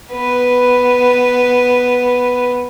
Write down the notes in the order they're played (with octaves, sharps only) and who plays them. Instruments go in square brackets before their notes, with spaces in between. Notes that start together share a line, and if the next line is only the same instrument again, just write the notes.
[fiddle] B3 B4